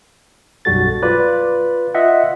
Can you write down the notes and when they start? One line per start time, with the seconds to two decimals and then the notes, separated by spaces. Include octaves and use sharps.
0.65 B1 F#2 G3 F#4 A4 A6
1.02 F4 B4 D5
1.94 F4 D#5 E5 F#5